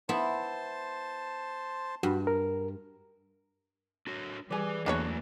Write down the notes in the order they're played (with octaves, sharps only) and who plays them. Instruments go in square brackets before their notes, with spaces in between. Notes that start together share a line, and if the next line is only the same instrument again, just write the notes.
[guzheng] B3 E4 [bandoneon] C5 A5 C6
[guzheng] G2 [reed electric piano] F#4
[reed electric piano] A#4
[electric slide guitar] D4 F#4 C#5
[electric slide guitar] E3 B4 [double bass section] G3 [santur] G#4 D5
[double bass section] E2 E3 A3 [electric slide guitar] F#3 A#3 [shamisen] D4 B4 C#5